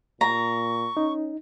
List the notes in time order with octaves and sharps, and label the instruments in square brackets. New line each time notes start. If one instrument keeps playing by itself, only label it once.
[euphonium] A#2 [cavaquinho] A#5 [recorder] C#6
[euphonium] C#4 [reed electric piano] D#4